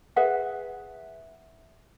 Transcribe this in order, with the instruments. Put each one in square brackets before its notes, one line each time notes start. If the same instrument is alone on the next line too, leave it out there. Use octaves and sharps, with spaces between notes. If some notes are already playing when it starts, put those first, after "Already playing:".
[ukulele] G#4 B4 E5 F#5